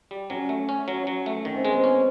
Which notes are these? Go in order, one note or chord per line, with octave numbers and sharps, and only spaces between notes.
G3
F#3 C#4
A3
C#4
F#3
F#3
A3
D#3 C#4
C4
G#3 B3
C4
C#4